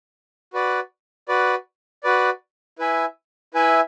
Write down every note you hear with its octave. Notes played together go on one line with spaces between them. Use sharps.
F#4 B4 D5
F#4 B4 D5
F#4 B4 D5
E4 B4 E5 G#5
E4 B4 E5 G#5